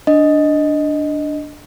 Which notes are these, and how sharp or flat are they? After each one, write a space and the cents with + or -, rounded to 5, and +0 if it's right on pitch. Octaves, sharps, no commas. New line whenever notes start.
D4 +0 D#5 +0